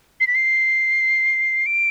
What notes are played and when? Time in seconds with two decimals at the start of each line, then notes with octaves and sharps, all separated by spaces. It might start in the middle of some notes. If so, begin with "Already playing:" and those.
0.20 C7
0.27 B6
0.35 C7
1.66 D7